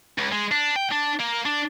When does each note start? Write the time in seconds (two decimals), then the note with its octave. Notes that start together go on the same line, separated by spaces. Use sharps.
0.18 C#2
0.33 G#3
0.52 D4
0.76 G5
0.91 D4
1.19 A#3
1.46 D4